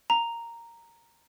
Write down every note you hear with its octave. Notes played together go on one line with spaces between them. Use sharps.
A#5